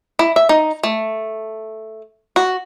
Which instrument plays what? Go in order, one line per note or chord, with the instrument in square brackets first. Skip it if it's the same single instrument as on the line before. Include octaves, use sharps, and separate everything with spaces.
[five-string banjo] E4
E5
D#4
A3
F#4